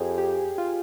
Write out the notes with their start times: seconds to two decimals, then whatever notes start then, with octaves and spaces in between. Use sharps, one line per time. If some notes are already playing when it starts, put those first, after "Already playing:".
Already playing: F2 G4 G#4
0.18 G4
0.58 F4